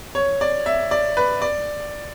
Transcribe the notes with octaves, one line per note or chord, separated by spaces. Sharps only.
C#5
D5
E5
D5
B4
D5